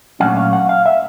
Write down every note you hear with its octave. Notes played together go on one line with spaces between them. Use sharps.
A#2 F#3 A3 C#4 F#5
F5
F#5
F5
E5